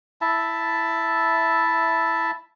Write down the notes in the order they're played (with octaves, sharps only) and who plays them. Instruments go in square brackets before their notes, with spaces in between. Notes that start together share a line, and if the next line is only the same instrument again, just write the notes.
[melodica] E4 E5 A5